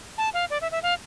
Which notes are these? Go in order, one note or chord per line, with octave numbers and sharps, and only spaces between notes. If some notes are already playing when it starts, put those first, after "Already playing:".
A5
F5
D5
E5
E5
F5